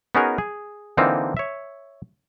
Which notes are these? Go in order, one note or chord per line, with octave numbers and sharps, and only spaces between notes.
B3 C#4 D#4 F#4 G#4 A#4
G#4
D3 E3 A#3 C4 D#4 F4
C#5 E5